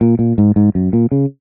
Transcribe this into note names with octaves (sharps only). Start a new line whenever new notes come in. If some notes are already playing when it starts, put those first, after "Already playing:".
A#2
A#2
G#2
G#2
F#2
A#2
C#3